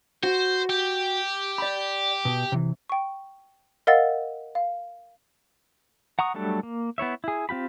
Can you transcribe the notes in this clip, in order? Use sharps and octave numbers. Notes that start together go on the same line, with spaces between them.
F#4 C5
G4
D5 B5
B2
C3 E3
G5 C#6
A#4 D#5 F5 F#5 E6 A6
F5
F#5 A#5 C#6 D#6
F#3 G3 A3 D4 A4
A#3
B3 E4 C#5 E5
E4 G#4
C4 F4 G4 B5